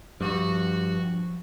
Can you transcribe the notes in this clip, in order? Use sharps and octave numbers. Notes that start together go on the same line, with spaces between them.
G2 F3 F#4